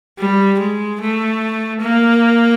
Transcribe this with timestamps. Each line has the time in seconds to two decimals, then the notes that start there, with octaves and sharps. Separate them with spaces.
0.19 G3
0.59 G#3
1.01 A3
1.81 A#3